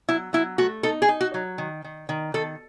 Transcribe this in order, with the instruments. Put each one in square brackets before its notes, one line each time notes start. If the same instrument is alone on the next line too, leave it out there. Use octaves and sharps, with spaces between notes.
[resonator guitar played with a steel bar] F#3 E4
F#3 E4
A3 F#4
D#4 A4
G#4
D#4
F#4
F#3
D#3
D#3
D#3
D#3 A4